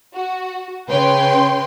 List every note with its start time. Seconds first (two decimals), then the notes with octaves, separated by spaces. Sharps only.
0.14 F#4
0.89 C#3 B4 C#5 G5 C6